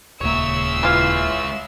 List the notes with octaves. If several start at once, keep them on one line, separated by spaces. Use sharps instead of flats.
D#1 C#2 G#3 A#3 C#5 E5 E6
E3 F4